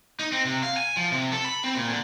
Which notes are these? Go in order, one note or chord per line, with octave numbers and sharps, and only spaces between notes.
D#4
C4
C3
F5
G#5
F3
C3
A4
B5
C4
A#2
D3